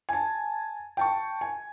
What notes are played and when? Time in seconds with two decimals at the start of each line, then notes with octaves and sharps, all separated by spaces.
0.09 G#5 A5
0.97 G5 A5 C#6
1.41 G#5